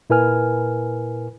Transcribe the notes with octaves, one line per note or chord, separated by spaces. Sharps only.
A#2 E4 A#4 B4 G#5 F6